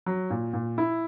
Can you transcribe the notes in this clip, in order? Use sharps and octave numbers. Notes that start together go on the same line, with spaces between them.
F#3
A#2
A#2
E4